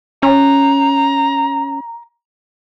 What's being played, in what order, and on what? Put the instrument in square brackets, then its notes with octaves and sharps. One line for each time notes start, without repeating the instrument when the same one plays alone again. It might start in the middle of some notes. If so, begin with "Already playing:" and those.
[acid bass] C#4 [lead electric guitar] A#5